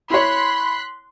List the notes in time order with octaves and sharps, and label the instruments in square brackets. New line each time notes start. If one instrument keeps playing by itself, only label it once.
[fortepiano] E4 C#5 [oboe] B5 [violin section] C6 F#6 B6